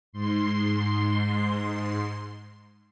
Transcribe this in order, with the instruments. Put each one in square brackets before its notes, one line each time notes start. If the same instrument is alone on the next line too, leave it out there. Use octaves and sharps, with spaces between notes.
[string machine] G#2 C6